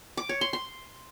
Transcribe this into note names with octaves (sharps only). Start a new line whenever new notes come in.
D6
C#5
C6
C6